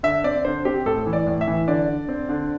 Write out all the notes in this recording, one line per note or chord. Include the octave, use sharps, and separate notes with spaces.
D3 E5
C4 D5
D3 C5
C4 G4
A2 A4
E3
D5
A2
E5
E3
D3 D5
D3
C4
D3